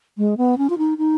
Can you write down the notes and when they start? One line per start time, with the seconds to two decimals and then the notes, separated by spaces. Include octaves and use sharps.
0.18 G#3
0.37 B3
0.58 C#4
0.70 F4
0.78 D#4
0.98 D#4